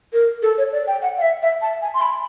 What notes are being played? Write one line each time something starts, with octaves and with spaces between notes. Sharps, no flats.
A#4
A4
C#5
D5
G5
F#5
F5
E5
E5
A5
G#5
C6
B5